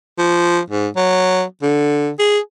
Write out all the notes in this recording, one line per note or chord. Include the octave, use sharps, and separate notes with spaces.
F3
G#2
F#3
D3
G#4